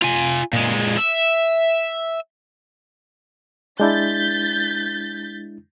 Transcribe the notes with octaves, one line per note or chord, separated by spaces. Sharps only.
F4 G#5
A#2 G#3
E5
G#3 D4 E4 G6 A6 B6